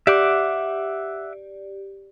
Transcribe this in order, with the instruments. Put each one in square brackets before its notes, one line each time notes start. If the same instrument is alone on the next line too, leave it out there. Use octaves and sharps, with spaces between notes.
[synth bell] G4 D5 [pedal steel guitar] E5 F#5 D6